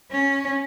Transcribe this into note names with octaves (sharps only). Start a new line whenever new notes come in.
C#4